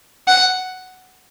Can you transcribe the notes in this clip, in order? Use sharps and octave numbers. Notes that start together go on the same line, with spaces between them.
F#5